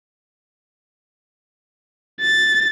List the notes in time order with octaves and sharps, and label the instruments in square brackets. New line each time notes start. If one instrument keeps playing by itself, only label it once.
[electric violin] A6